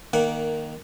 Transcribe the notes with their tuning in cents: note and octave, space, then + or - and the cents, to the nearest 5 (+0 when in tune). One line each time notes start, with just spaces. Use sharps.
D#3 -10 A#3 +0 F#5 +5